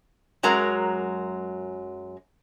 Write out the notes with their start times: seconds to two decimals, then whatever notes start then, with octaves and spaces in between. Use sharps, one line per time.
0.43 F#2 F#3 G#3 A#4 A#5